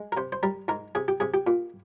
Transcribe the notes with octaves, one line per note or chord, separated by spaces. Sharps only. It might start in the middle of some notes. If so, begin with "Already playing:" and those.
Already playing: G#3
A#4
C3 C5
C5
G3 A#4
G#2 A#4
C3 G#4
G4
C3 G#4
G4
A#2